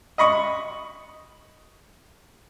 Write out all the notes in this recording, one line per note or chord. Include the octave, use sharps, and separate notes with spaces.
D#5 B5 C#6